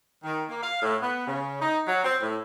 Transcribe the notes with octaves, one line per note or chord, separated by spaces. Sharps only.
D#3
A#3
F5
A2
B3
C#3
D#4
F#3
C4
A2